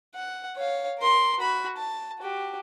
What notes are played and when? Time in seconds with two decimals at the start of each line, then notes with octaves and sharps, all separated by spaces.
0.15 F#5
0.56 C#5 F5
0.99 A#4 C6
1.40 F#4 B5
1.77 A5
2.19 F#4 G4